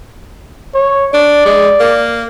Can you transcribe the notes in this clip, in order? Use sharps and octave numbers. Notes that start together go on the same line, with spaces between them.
C#5
D4 D5
G#3
A#3